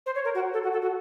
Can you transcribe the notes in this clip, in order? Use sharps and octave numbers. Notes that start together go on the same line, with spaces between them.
C5
C#5
A#4
F#4
A4
F#4
A4
F#4